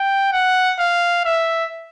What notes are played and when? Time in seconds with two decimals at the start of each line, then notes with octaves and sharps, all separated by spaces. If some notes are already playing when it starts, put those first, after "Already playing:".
Already playing: G5
0.33 F#5
0.79 F5
1.25 E5